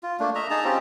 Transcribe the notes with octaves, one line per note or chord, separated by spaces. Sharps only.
F4
A3 A#3 D4
D#5 E5 A#5
D#4 G#4 A5 A#5
C4 C#4 F4 G4